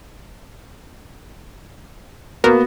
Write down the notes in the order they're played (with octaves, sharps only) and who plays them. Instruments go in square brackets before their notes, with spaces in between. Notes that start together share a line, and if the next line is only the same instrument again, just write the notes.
[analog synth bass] A#3 [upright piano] B3 F#4